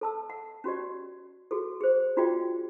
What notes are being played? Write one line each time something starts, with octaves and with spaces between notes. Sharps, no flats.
A4 A5 E6
F#5
C#4 F#4 G4 D5
F#4 G#4 A4
G#4 C5
D4 F4 F#4 G#4 D5 G5